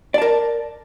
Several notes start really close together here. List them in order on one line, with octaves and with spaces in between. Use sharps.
D5 A5 A#4